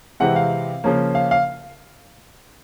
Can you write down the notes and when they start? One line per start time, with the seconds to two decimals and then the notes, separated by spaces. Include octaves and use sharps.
0.20 C3 E3 G#3 C4 F#5
0.36 F5
0.84 C#3 F3 A#3 C#4
1.15 F5
1.31 F5